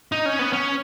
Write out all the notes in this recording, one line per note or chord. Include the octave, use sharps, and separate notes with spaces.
D#4
C#4
B3
C#4